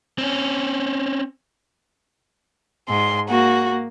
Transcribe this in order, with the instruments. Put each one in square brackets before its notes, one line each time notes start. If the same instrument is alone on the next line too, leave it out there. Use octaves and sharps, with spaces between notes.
[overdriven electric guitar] C4 C#4
[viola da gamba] G#2 [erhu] C6
[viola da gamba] A#3 [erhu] F#4